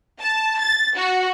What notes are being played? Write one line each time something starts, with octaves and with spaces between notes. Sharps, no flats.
A5
A6
F#4